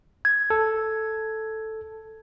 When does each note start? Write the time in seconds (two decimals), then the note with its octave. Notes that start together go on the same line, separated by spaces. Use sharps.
0.25 G#6
0.50 A4